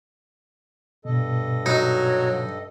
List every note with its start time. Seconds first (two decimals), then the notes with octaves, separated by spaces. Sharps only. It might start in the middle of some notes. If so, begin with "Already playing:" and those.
1.05 G2 B2 A4 D#5
1.66 F#3 D#4